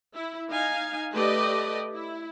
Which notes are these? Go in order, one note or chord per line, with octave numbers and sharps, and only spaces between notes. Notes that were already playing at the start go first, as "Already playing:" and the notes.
E4
D#4 F5 G#5
A3 G4 B4 D5 D#5
E4